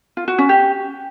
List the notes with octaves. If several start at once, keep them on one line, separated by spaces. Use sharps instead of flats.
F4
F#4
C#4
G4